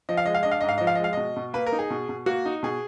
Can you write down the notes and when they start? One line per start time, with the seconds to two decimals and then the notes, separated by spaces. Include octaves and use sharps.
0.09 F3 D#5
0.17 F5
0.26 G#3 D#5
0.35 F5
0.43 D4 D#5
0.51 F5
0.61 G#2 D#5
0.69 F5
0.78 F3 D#5
0.87 F5
0.95 D#5
0.99 G#3 F5
1.13 B2 D#5
1.36 B2
1.53 A#3 B4
1.66 A#4
1.72 D#4
1.79 G#4
1.90 B2
2.09 B2
2.26 A#3 F#4
2.46 D#4
2.63 B2 G#4